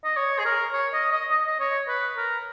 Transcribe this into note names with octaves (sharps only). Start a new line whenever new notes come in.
D#5
C#5
G#4
A#4
C#5
D#5
D#5
D#5
D#5
C#5
B4
A#4